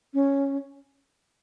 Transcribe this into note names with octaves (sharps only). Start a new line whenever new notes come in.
C#4